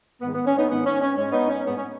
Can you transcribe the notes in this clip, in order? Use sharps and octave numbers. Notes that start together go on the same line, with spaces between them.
G#2 D#3 G#3 B3
B3
C#4
B3 D#4
G#2 D#3 G#3 B3
C#4
C#4
G#2 G#3 C#4
B3 D#4
C#4
G#2 G#3 B3
C#4